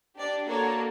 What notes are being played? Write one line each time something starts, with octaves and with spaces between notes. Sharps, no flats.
D4 G4 D5
A#3 D4 F#4 A4 C#5